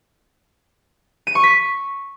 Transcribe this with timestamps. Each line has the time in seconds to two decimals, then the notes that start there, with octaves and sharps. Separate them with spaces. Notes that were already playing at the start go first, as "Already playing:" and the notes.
1.27 D#7
1.35 C#6
1.43 B6